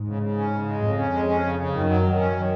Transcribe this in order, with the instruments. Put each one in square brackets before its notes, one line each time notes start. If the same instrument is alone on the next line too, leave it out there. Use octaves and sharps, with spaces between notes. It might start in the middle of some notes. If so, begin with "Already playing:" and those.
Already playing: [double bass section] G#2
[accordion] C#3
C#3
C#4
C#3
G#3
[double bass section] F2 [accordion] C#3
[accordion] C#4
G#3
C#4
C#3
C#3
[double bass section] F#2 [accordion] D#3
[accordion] F#3
D#3
[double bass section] F#2 [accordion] C#4
[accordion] D#3